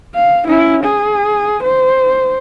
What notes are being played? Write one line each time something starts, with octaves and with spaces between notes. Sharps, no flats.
F5
C#4 E4
G#4
C5